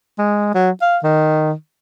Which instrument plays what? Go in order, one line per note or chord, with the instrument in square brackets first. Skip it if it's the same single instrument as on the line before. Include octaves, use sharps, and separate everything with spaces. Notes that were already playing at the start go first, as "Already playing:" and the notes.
[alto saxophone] G#3
F#3
F5
D#3